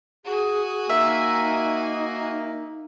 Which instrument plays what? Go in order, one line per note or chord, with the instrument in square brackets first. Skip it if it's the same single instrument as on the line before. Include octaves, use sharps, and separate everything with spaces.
[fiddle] F#4 G#5 [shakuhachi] G#4
[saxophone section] A#3 [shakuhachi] D#4 [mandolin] E5